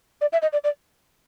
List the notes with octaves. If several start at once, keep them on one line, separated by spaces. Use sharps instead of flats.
D5
E5
D#5
D5
D5